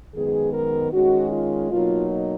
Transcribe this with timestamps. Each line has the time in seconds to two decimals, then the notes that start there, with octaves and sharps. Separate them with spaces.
0.14 F#2 D#3 G#3 B3 G#4
0.53 A#4
0.92 D#3 G#3 C#4 F#4
1.32 F4
1.70 B2 F#3 A#3 D#4 F4